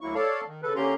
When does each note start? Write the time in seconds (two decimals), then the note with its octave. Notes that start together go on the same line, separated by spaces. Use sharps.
0.01 D2 F#3 A#3 E4 C#6
0.15 A4 C#5 D5 F5 A5
0.47 D#3
0.63 C#3 A4 B4
0.76 D3 A#3 C#4 G4 A#5 C6